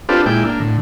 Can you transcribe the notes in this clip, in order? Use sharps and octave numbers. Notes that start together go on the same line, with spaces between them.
C4 D4 F4 G4 A4 B4
A#2 G#3 E4 G5 D6
A#3 D4
A2 D3